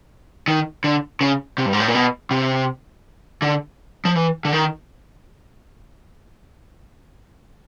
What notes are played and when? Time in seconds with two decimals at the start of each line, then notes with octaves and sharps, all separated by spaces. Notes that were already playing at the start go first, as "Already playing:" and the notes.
0.48 D#3
0.84 D3
1.21 C#3
1.58 C3
1.66 G2
1.73 G#2
1.80 A2
1.88 A#2
1.95 B2
2.31 C3
3.42 D3
4.05 F3
4.16 E3
4.45 D3
4.53 D#3